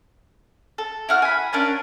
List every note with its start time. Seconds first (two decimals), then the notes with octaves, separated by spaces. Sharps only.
0.78 A4
1.09 E4 F#4 F6
1.22 G#5 B5
1.53 C#4 D4 A#4 G#5